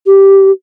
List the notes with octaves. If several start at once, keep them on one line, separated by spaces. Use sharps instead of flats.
G4